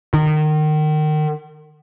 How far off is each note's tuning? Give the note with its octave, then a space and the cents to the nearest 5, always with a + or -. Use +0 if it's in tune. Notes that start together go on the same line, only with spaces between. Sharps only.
D#3 -25